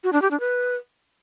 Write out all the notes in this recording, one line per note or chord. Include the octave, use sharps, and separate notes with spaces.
F#4
D4
G4
D4
B4